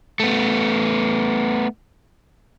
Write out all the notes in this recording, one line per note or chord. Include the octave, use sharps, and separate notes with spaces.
A3 B3